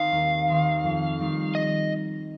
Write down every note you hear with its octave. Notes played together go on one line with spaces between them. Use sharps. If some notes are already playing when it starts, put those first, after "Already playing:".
Already playing: D#3 C4 D#4 F5
D#2
D#3 C4 D#4
F2
D#3 G3 D#4
D#5